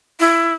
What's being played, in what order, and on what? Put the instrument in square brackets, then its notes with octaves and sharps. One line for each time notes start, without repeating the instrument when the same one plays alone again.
[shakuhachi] E4